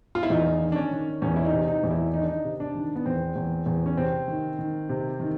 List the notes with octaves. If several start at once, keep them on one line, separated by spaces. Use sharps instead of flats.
F4
E4
E2 D#4
D#3
D4
C#4
D#3
E2 C#4
E4
D#4
C3
D#4
E2
E4
D#3 D#4
D4
D#4
C3
D4
D#3
B3
E2 C4
E2
E2
C#4
C3 C4
D#3
D#3
C3
D#3